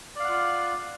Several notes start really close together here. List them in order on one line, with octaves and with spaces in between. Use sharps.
D5 F5 F#5 F4